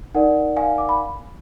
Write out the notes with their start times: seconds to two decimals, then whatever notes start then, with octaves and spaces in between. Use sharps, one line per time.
0.14 D#4 A#4 D5 F#5
0.57 F5 G#5
0.78 D6
0.89 B5